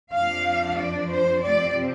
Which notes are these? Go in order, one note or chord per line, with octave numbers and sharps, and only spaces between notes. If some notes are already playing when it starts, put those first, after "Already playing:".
F2 F3 D4 F5
D5
C5
F2 C3 F3 C4 D5